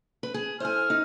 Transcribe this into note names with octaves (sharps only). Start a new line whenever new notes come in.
B4
G#4
E4 A4 C5 G#5 F6
D#4